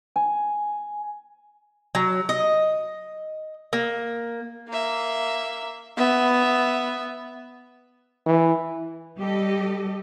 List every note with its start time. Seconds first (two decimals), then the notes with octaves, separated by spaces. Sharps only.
0.16 G#5
1.95 F#3
2.29 D#5
3.73 A#3
4.69 A#3 E5
5.97 B3 E5
8.26 E3
9.18 G3 G4 A4 D#5